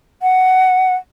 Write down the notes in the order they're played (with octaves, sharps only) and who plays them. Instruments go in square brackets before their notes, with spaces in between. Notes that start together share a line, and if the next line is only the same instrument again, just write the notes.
[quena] F#5